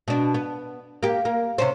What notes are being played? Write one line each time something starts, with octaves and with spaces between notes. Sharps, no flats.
B2 D4
B3
A#3 G4
A#3
C3 C#4 C5